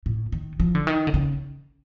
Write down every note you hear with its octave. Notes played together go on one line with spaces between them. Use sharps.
A2
D#3
F3
D3
D#3
D3
C#3